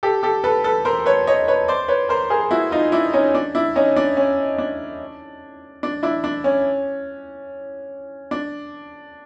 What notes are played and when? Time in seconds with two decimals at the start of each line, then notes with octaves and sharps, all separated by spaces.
0.03 G4 A4
0.23 G4 A4
0.44 A4 B4
0.64 A4 B4
0.85 A#4 C5
1.06 B4 C#5
1.27 C#5 D#5
1.48 B4 C#5
1.68 C5 D5
1.88 B4 C#5
2.09 A#4 C5
2.30 G#4 A#4
2.51 E4 F#4
2.71 D#4 F4
2.92 D4 E4
3.13 C#4 D#4
3.35 D4
3.55 D4 E4
3.76 C#4 D#4
3.96 D4
4.17 C#4
4.58 D4
5.83 D4
6.03 D4 E4
6.24 D4
6.44 C#4
8.31 D4